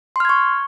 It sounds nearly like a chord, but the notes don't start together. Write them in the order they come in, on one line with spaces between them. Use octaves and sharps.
C6 F6 G#6 C#6